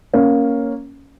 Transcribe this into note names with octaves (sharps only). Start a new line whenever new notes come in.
A#3 C#4